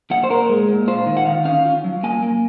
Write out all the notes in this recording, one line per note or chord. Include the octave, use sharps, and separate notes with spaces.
A#2 F#5
C5
A#2 A#4
G#3
A#2
F4 C5
D#3
F#5
D#3 F5
C#4 F5
F4
F#3
A#3 G#5
A#3